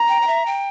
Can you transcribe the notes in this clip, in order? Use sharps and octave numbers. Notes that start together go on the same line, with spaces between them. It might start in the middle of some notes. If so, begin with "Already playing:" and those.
Already playing: A#5
G5
G5
E5
G5